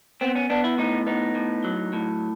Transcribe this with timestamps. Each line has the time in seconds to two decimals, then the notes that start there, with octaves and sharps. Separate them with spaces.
0.21 B3 C4
0.35 C#4
0.50 B3 D4
0.64 E4
0.78 A2 D#4
1.07 B3 D#4
1.35 A2
1.64 F#3
1.93 A2